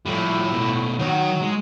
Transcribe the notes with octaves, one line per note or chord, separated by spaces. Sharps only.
A2 F3 G3
B2 A3
D#3 F#3 F#5
G#3